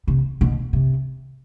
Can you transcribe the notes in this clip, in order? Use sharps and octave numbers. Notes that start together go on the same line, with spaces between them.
C3
B2
C3